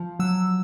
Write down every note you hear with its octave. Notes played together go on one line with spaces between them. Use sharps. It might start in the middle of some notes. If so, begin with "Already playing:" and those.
Already playing: F3
F#3 E6